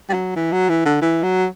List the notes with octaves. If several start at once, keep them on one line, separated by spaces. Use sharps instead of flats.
G3
F#3
E3
F#3
E3
D3
E3
F#3